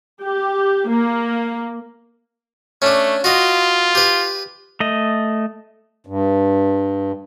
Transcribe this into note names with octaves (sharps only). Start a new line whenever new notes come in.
G4
A#3
A3 C#4 D4
F4 F#4 D#5
G4 B4
A3 D#5
G2